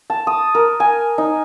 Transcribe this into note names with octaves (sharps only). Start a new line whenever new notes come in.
A5
D#6
A#4
G#5
D#4